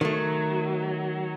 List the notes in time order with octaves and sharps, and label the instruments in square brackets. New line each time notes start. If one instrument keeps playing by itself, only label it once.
[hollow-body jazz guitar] D#3 A3 [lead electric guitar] F#3